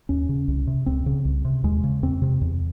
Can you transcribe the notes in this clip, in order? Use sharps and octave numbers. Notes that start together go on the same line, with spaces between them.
D#2 C#4
C#3
C2
C3
C#2 C4
C#3
C2
C3
D#2 G#3
C#3
E2 C4
C3
E2